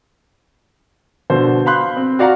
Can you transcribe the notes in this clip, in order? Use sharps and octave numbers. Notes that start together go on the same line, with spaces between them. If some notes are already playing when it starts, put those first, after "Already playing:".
B2 D3 C5
F5 B5 C6 F#6 G6
C4
F#4 D5 F5 F#5 A#5